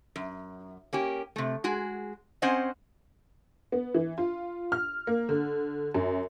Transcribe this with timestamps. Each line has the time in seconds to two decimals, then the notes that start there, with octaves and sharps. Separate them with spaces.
0.16 F#2
0.93 A#3 C#4 G4
1.36 C3 A3
1.64 G#3 F#4 G#4
2.42 C4 C#4 C5 D#5 F#5 G#5
3.72 B3
3.95 E3
4.18 F4
4.72 F6
5.07 A#3
5.29 D3
5.94 F#2